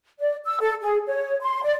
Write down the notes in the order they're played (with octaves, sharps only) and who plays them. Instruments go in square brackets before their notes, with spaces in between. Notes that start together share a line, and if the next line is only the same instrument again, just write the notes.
[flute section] D5
E6
A4
G#4
C#5
C6
D5